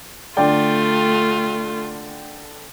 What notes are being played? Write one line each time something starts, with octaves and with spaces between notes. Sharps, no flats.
D3 A3 F4 D5 G5